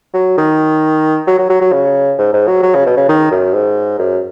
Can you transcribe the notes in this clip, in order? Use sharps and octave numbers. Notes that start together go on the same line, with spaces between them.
F#3
D#3
F#3
F#3
F#3
F#3
C#3
G#2
G#2
F#3
F#3
C#3
B2
C#3
D#3
F#2
G#2
F#2